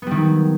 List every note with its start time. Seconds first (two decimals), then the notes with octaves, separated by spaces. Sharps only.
0.02 B3
0.07 G3
0.11 D#3
0.16 F#3